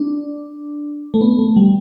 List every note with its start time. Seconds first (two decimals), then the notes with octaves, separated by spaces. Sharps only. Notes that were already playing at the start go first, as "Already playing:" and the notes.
Already playing: D4
1.14 A3
1.21 B3
1.39 A3
1.56 G3